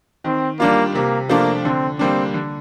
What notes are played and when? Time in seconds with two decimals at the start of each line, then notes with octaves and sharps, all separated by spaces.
0.24 D#3 C4
0.59 G3 A#3 D4 F4
0.95 C3 A#3
1.29 F3 A3 A#3 D4 F4
1.64 D3 C4
1.99 G3 A#3 C4 D4
2.34 D3